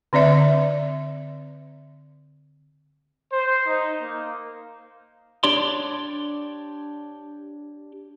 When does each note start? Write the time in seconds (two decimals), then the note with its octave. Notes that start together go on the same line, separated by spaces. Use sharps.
0.13 D3 C4 D5 E5
3.32 C5
3.67 D#4
4.01 A#3
5.43 D4 G4 C#5 D5 C6